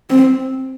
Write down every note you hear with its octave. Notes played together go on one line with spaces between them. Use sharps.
C4